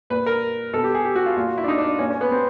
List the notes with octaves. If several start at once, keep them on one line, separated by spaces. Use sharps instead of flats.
A#2 B4
A#4
B2 A4
G4
G#4
G4
F#4
F4
A#2 F4
F#4
E4
D4
D#4
D4
A#2 C#4
C#4
B3
C4